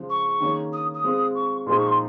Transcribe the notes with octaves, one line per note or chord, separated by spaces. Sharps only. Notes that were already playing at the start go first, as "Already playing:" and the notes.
Already playing: C#3 F3 G#3
C#6
D#3 A#3 C#4 G#4
D#6
D#6
G#3 C4 F4
C#6
A#2 F3 G#3 D#4 G#4 C6
C#6
C6